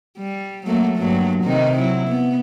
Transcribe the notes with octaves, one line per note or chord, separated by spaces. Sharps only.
G3
F#3 A3 A#3
G2 F#3 A#3
C3 D#3 D#4
F#3 E4
B3